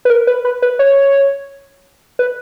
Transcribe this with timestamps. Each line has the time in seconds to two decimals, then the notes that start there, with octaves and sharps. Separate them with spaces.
0.05 B4
0.10 A#4
0.27 B4
0.45 B4
0.62 B4
0.79 C#5
2.19 B4